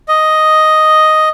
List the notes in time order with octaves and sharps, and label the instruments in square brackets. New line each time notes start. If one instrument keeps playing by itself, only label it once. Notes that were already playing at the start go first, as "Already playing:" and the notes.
[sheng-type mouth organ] D#5